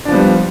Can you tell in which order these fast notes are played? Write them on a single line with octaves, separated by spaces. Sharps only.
D4 F3 B3 G3